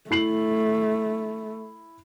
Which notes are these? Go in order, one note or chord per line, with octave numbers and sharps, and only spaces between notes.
A3 E4 C7 F#7